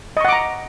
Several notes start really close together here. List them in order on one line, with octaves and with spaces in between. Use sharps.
D#5 C#6 F#5 D6 A#5